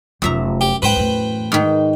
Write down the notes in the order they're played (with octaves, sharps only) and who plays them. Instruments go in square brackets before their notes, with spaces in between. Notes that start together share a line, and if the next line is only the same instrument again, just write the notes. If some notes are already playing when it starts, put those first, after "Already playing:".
[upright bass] F1 F4 [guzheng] F#2 E5 A#5
[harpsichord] G4
[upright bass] G#2 [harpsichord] B4 C5 G5
[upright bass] E2 A2
[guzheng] G#2 D#3